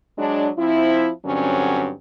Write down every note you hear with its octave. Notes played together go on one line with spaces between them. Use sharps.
F#3 G#3 D4
F3 C4 E4
G2 D3 F#3 C4 C#4